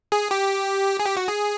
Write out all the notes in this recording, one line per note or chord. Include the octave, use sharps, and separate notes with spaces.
G#4
G4
G#4
G4
F#4
G#4